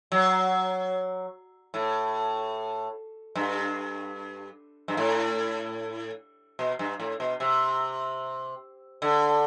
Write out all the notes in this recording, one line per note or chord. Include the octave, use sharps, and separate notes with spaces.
F#3
A2
G2
G2
A2
B2
G2
A2
B2
C3
D3